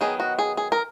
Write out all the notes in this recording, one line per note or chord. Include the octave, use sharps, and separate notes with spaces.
D#3 F#3 B3 D#4 G#4
F#4
G#4
G#4
A#4